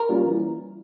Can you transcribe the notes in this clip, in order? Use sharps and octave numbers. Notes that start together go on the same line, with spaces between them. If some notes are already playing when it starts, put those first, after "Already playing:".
Already playing: A#4
G3 A#3 C#4 F4
E3